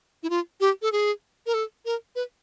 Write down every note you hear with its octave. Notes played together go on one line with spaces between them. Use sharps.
E4
F4
G4
A4
G#4
A#4
A4
A#4
B4